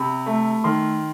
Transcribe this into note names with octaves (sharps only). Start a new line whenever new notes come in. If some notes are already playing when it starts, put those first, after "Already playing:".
Already playing: C3 B5
A3
D#3 C6